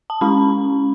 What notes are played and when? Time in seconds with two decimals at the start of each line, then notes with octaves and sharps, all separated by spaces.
0.10 A5
0.21 G#3 C#4 E4 B5